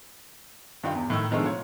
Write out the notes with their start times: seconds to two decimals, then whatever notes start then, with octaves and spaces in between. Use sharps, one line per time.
0.83 G2 D#3 F4 G5
0.95 E2
1.10 A2 D#3 E6
1.31 B2 D#3 F3 G#3 A3 D4
1.45 F4 C#5